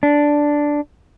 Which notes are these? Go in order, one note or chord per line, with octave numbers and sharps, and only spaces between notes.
D4